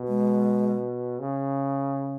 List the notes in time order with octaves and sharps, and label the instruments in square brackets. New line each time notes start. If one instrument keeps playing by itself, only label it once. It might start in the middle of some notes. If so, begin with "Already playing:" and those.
Already playing: [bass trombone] B2
[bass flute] G#3
[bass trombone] C#3